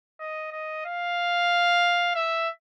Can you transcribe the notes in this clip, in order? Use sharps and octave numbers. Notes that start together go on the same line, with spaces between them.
D#5
D#5
F5
E5